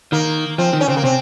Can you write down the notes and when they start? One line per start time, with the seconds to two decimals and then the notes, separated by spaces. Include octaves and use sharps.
0.12 D#3 A#3
0.58 F3 C4
0.73 D#3
0.81 C#4
0.88 C#3 C4
0.97 A#3
1.04 C3 C4